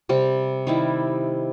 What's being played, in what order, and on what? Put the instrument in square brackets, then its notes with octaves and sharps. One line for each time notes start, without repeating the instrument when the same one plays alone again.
[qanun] C3 G3 C4
D#3 G3 E4